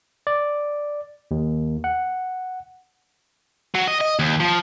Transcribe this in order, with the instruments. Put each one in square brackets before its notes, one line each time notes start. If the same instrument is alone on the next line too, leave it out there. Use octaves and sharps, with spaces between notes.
[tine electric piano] D5
D#2
F#5
[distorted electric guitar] F#3
D#5
D#5
D#2
F3